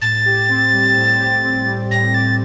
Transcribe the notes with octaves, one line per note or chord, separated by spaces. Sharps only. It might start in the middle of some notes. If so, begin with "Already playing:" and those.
A2 A6
G4
C4
G3
A2
G4
C4
G3
A2 A#6
G4 A6